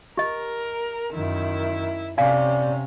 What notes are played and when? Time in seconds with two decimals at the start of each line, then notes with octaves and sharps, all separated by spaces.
0.17 G4 A#4 D#5
1.13 F#2 D#3 E4
2.18 C3 C#4 D5 F5 G#5